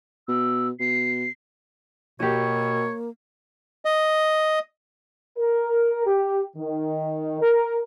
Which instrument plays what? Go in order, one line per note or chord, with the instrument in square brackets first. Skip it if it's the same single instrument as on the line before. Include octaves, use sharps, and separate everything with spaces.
[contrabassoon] B2 [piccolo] E6
[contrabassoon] B2 [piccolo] C7
[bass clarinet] B2 [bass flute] A#3 [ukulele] F#4 G4 [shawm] C#5
[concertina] D#5
[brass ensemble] A#4
G4
D#3
A#4